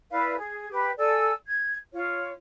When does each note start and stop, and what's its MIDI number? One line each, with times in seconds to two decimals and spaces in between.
0.10 0.34 64
0.10 0.34 71
0.10 0.34 74
0.10 0.34 77
0.36 0.67 68
0.70 0.90 67
0.70 0.90 71
0.98 1.31 69
0.98 1.31 74
0.98 1.31 80
0.98 1.31 88
1.47 1.76 92
1.92 2.32 65
1.92 2.32 73